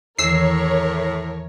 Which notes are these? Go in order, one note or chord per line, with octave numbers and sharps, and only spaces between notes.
E2 A2 D#3 E3 A#4 C#5 E6 C7